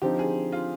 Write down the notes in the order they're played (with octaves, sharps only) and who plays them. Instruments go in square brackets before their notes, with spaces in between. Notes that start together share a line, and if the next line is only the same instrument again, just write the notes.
[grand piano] D3 F3 C4 D#4 [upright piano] G4
[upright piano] G#4
F4